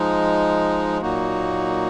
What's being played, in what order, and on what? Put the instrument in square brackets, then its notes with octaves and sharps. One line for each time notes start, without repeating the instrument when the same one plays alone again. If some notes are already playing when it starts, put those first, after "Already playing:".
Already playing: [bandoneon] F3 G#3 D#4
A#2 F#3 A#3 D#4 F#4